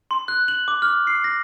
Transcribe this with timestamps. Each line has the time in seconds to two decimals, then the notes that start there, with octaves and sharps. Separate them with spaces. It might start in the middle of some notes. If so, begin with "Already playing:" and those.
0.11 C6
0.28 F#6
0.48 F#7
0.68 D6
0.82 F6
1.07 C7
1.24 A#6